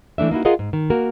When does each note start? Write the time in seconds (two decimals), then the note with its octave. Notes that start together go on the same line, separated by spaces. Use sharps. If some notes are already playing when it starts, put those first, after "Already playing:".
0.18 E3 A3 D4 E5
0.31 A#3 D#4 E4 F#4
0.45 F4 G#4 A#4 D#5 F5 F#5
0.59 G#2
0.73 D#3
0.90 A#3 F#4 A#4